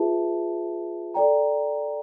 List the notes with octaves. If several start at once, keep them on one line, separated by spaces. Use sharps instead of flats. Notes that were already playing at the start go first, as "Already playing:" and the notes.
Already playing: F4 G#4 B4 E5 A5
A4 D5 G5 A#5